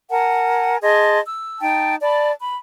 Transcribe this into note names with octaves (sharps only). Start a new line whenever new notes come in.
A#4 F#5 G#5 A5
G#4 D#5 A5 C6
E6
D#4 G5 A5
D5 A5 B5
B5